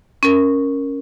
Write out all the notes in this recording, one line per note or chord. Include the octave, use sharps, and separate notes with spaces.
C#4 A#4